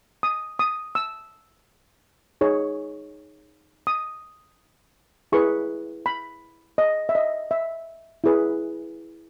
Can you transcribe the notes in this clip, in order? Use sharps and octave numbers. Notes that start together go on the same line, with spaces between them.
D#6
D#6
E6
D#4 G#4 C#5
D#6
E4 G#4 B4 C#6
B5
D#5
E5
D#5
E5
E4 G#4 B4